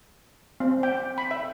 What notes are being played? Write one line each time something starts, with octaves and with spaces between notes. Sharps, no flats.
C4
G5
B5
E5